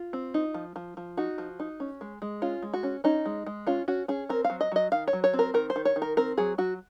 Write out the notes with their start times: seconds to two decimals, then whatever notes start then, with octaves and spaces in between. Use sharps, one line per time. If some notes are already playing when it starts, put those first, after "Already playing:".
Already playing: F4
0.13 C4
0.34 D#4
0.54 F3
0.76 F3
0.97 F3
1.17 D#4 F#4
1.38 F3
1.60 D#4
1.80 C#4
2.01 G#3
2.22 G#3
2.42 C#4 F4
2.63 G#3
2.74 F#4
2.83 C#4
3.04 C#4 D#4
3.26 G#3
3.47 G#3
3.67 C#4 F4
3.88 C#4 F#4
4.08 C#4 G#4
4.29 C4 A#4
4.44 F5
4.50 F#3
4.61 D#5
4.72 F#3 D#5
4.92 D#3 F5
5.08 C#5
5.13 F#3
5.24 C#5
5.33 C4
5.39 A#4
5.54 D#3 A#4
5.70 C5
5.76 D#3
5.85 C#5
5.96 D#3
6.02 A#4
6.17 C4 A#4
6.37 F#3 G#4
6.58 F#3 F#4